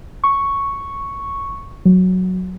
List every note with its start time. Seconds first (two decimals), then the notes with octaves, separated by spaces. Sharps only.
0.24 C#6
1.85 F#3